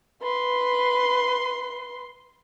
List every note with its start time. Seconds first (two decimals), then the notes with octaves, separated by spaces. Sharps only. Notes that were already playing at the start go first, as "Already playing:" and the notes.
0.22 B4 C6